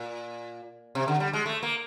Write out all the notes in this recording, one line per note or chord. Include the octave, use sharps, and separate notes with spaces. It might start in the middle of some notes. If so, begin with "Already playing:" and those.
Already playing: A#2
C3
D3
G3
G#3
A3
A#3